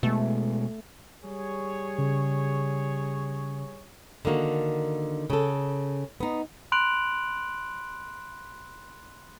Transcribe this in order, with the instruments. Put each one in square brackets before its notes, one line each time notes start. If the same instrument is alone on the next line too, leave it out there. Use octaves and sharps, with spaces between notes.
[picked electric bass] B2 G#3 [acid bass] A3
[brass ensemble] G3 G#4 C#5
[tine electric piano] C#3
[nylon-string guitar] D3 D#3 A#3 F#4
C#3 A4
B3 D#4
[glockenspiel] B5 C6 F#6 D7 F7 F#7